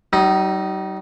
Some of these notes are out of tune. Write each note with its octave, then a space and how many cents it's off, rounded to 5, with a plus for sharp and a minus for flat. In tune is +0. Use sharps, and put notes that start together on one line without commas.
G3 -45 D#4 +0